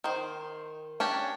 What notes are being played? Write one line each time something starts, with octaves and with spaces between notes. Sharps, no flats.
D#3 C5
C#4 D4 G4